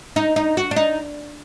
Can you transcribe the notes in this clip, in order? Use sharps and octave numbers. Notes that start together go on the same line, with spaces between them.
D#4
D#4
F#4
D4
D#4